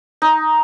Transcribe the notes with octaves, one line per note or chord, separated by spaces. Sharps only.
D#4